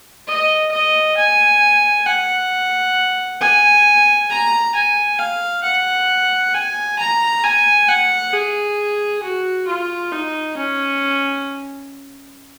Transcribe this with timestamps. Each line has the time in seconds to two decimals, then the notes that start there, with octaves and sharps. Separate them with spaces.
0.28 D#5
0.71 D#5
1.17 G#5
2.06 F#5
3.41 G#5
4.30 A#5
4.75 G#5
5.19 F5
5.64 F#5
6.54 G#5
6.99 A#5
7.44 G#5
7.88 F#5
8.33 G#4
9.23 F#4
9.67 F4
10.11 D#4
10.57 C#4